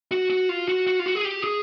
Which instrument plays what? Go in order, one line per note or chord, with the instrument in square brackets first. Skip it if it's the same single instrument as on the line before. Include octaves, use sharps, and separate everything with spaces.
[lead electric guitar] F#4
F#4
F4
F#4
F#4
F4
F#4
G#4
G4
G#4